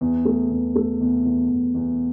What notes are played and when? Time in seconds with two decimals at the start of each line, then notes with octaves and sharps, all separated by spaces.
0.01 E2
0.25 A3
0.51 E2
0.75 A3
1.01 E2
1.25 E2
1.49 E2
1.75 E2